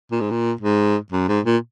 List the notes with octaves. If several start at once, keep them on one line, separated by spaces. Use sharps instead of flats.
A#2
G#2
A#2
G#2
F#2
G#2
A#2